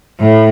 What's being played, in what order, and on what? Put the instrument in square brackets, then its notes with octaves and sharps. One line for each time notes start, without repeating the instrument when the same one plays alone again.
[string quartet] A2